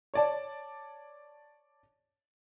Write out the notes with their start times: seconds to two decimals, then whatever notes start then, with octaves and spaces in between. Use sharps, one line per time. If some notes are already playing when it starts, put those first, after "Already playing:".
0.14 C#5 D5 A5